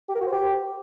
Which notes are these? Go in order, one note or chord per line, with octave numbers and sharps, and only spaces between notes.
G4
A#4
F#4
C5
G4